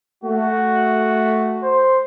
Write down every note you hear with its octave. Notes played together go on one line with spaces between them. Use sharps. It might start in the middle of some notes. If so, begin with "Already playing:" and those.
A3 F#4
C5